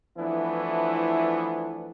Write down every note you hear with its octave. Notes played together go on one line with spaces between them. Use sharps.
E3 F3 A3 B3 D4 E4